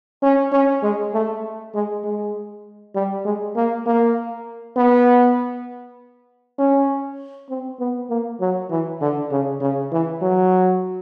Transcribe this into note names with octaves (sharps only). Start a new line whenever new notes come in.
C#4
C#4
G#3
A3
G#3
G#3
G3
G#3
A#3
A#3
B3
C#4
C4
B3
A#3
F#3
E3
D3
C#3
C#3
E3
F#3